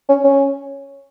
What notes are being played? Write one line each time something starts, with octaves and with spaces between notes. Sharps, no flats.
C#4
C#4